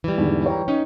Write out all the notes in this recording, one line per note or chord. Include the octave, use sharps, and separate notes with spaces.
E3 G3
E2 G#2 D3
C#5 G5 A#5
C#4 D#4